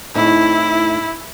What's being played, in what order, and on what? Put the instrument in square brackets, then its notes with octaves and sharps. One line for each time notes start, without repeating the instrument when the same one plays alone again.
[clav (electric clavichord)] A2 C4 D#4 [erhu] E4